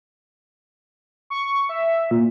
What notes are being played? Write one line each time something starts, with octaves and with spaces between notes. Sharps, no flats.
C#6
E5
A#2